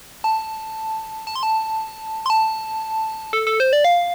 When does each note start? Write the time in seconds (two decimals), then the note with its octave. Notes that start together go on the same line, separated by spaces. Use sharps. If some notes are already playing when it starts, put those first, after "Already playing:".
0.24 A5
1.27 A5
1.35 C6
1.43 A5
2.26 C6
2.30 A5
3.33 A4
3.47 A4
3.60 C5
3.73 D5
3.84 F5